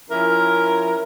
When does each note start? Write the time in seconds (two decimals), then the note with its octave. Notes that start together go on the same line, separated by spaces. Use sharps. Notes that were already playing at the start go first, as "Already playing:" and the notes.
0.08 F3 C#4 E4 A#4